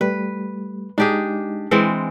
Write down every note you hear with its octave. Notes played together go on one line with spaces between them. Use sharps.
G3 A3 B4
G#3 D4 D#4 G4 G#4
E3 G#3 C4